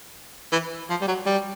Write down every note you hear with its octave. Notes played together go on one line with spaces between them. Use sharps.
E3
F3
G3
F#3
G3